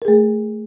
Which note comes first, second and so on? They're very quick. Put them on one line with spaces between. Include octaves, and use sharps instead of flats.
A#4 G#4 A3